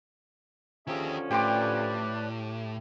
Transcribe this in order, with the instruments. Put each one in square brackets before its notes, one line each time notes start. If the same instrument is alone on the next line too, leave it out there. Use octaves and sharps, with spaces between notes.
[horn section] D3 F3 C#4 [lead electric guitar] D#3 G4 [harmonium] G#4 E5 A#5
[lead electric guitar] A2 [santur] G4 C6 D6 [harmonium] B4 D5